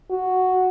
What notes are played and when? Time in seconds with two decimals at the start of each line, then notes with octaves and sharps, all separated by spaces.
0.10 F#4